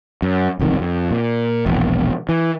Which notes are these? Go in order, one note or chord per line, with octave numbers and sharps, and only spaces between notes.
F#2
E1 C2 F2 D#3
F2
A#2
E1 A#1
E3